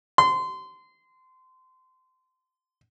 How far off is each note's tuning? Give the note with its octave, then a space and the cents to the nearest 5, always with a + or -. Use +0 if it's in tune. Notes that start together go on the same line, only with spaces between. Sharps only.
C6 -25